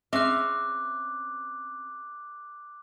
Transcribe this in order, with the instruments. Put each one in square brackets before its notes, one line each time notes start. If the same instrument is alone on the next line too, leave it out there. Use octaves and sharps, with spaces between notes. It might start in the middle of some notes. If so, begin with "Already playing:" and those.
[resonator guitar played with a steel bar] C4 C#4 [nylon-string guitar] G#4 E5 [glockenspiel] D6 F#6